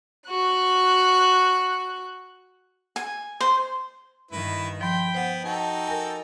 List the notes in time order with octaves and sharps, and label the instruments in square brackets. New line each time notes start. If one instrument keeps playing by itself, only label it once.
[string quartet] F#4 F#6
[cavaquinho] G#5
C5
[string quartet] G2 D#3 [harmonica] E4 B4
[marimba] F3 [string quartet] G5 B5 [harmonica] C6
[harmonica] B3 [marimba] C5 F#5
[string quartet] D#4 [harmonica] F#4 A4 G5
[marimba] A#4 G#5